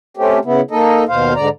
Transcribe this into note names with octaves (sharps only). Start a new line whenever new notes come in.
A3 C4 C#4 G4
C#3 B3 E4
A#3 D#4 A4 D#5
D#2 B2 C5 F5
G#2 D3 D5 A#5